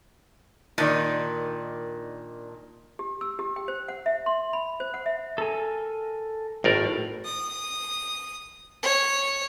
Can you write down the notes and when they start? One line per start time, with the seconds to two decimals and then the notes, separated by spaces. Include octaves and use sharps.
0.78 A#2 D#3 D4 D#4 D5
2.99 G4
3.21 E6
3.39 G4
3.56 G5
3.68 C5
3.89 F#5
4.06 E5
4.26 C6
4.53 B5
4.80 C5
4.94 F#5
5.06 E5
5.38 A4 A#4 G#5
6.64 G#1 A2 A#4 D5
7.25 D#6
8.83 C#5